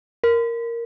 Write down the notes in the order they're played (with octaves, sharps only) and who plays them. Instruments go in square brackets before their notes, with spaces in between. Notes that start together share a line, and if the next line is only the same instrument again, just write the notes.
[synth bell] A#4